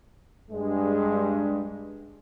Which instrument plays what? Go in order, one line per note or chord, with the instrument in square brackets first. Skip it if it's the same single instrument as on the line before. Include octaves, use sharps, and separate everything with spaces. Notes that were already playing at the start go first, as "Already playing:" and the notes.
[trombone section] G2 G#3